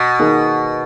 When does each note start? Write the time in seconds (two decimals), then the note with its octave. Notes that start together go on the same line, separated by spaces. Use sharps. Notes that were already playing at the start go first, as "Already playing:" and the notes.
Already playing: B2
0.19 D#3 A#3 D#4 G#4